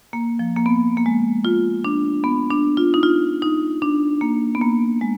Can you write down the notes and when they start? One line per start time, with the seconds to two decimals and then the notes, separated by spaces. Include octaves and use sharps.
0.13 A#3
0.39 F3
0.56 A#3
0.66 B3
0.97 A#3
1.06 G#3
1.45 F4
1.85 D4
2.24 B3
2.50 D4
2.77 F4
2.94 D#4
3.03 F4
3.42 D#4
3.82 D4
4.21 A#3
4.55 B3
4.61 A#3
5.01 G#3